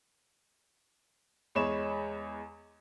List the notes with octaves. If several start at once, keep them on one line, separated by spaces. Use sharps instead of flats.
E2 G#3 C#5 B5 E7